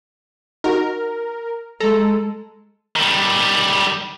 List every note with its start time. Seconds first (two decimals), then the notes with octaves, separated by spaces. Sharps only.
0.64 D#4 F#4 A#4
1.80 G#3 A4 A#5
2.96 D#3 G3